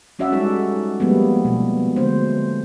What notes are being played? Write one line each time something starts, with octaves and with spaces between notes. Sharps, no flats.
F#3 C#4 F#4 D5 E5 F#5
G3 G#3 D#4 A4
F3 G3 G#3 A#3 B3
B2
D3 F#3 G#3 A3 D4 C5